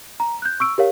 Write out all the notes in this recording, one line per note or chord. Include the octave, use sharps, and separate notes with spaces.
A#5
F#6 G6
C#6 E6 D7
G4 A#4 C#5 F5